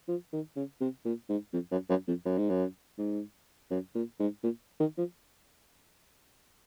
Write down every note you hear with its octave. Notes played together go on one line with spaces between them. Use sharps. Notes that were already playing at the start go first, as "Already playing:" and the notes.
F3
D#3
C#3
C3
A#2
G#2
F2
F#2
F#2
F2
F#2
G#2
F#2
G#2
F#2
A#2
G#2
A#2
D#3
F3